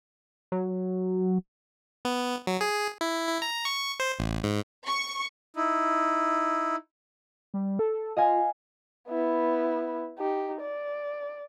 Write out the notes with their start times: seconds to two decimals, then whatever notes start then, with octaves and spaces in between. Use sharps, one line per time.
0.52 F#3
2.05 B3
2.47 F#3
2.61 G#4
3.01 E4
3.28 E4
3.42 A#5
3.65 C#6
4.00 C5
4.19 A1
4.43 G#2
4.86 C#6
5.56 D#4 E4
7.54 G3
7.79 A4
8.17 F4 D#5 F5 G#5
9.08 B3 E4
10.18 D#4 G4
10.61 D5